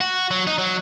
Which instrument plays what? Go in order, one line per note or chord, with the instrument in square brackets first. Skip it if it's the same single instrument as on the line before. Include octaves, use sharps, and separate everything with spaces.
[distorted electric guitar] F#4
F#3
D#4
F#3